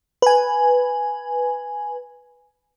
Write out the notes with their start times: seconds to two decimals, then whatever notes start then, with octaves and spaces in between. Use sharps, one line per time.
0.22 B4 G#5